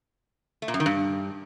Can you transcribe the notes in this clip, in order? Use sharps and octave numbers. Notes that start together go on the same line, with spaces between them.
A3
A#2
F#2
D#3
G2